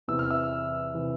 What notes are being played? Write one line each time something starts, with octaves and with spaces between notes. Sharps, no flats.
E2 C3 E3 E6
F6
E5 E6
C3 E3